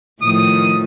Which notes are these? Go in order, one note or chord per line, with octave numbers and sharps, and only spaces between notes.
A2 D#3 F3 D#6